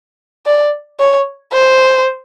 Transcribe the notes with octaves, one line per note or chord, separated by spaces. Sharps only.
D5
C#5
C5